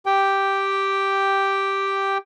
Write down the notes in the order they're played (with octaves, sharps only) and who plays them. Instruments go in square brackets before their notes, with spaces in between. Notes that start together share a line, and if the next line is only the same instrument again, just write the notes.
[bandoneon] G4 G5